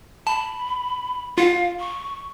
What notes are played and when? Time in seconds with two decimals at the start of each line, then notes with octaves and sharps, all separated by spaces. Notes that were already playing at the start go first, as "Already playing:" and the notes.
0.27 A5 B5
1.38 F4 F5
1.79 C#6